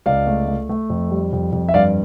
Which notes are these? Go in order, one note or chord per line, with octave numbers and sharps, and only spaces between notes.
C#2 D5 F5
A3
A3
A3
F2
G3
F2
F2
E5
G2 D5 F5